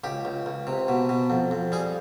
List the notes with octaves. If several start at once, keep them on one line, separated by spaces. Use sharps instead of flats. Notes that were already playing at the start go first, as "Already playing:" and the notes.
C#2 G4
C#2
C#2
C3
B2
B2
F2
F2
G3 G#4